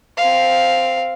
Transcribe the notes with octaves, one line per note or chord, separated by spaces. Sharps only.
C4 F5